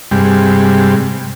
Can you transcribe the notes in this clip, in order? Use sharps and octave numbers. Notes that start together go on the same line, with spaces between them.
G2 C3 G3 G#3